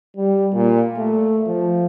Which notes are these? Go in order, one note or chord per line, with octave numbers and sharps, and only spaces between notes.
G3
A#2
A3
F3